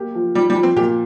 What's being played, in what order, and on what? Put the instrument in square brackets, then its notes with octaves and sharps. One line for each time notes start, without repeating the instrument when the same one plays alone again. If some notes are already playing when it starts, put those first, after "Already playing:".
Already playing: [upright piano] A#3 G4
F3
[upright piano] F3 [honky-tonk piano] G3
[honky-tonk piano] G3
[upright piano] F3
[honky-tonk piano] C4
[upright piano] A#2 [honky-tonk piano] G4